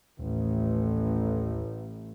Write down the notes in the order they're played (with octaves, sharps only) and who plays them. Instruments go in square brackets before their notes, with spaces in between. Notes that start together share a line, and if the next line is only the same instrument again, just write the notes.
[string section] A1 [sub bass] D#2